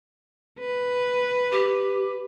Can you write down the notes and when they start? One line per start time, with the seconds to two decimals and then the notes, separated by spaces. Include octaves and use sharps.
0.59 B4
1.52 G4